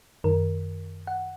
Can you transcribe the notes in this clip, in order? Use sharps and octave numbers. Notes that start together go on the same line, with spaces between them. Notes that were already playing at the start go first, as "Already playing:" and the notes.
F#2 D#3 A#4
F#5